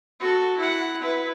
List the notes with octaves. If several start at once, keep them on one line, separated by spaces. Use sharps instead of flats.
F#4 A4
E4 F#5
E4 B4